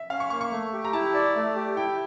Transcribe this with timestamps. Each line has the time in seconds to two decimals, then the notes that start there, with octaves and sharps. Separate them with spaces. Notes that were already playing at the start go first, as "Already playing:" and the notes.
Already playing: E5
0.10 C#4 F5
0.20 C#6
0.30 A#3 C#6
0.41 C#6
0.51 A3
0.73 G4
0.85 A#5
0.93 E4 A5
1.14 D5
1.36 A3
1.56 G4
1.76 E4 G5